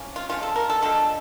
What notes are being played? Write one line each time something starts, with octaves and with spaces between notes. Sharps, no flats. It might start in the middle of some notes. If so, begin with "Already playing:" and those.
Already playing: F3 A#3 C#4
F4
D3 F3 G#3 F4
A4
A#4
A4
D3 F3 G#3 A4